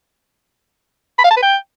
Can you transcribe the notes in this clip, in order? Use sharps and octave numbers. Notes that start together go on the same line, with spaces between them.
B5
F5
A5
B4
G5